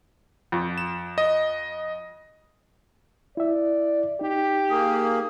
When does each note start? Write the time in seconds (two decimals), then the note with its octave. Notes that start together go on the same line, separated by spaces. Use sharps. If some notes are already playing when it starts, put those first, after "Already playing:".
0.52 F2
0.78 E7
1.18 D#5
3.37 E4 D5 E5
4.21 D#4 G4
4.70 A#3 G#4